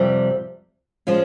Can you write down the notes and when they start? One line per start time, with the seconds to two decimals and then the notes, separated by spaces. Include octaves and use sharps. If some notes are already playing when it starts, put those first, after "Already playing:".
Already playing: F2 C3 G3
1.07 F3 G#3 C#4 F4